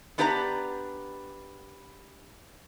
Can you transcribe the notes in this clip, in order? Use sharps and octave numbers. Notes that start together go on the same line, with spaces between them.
B3 D4 G4 B4 D#5 A#5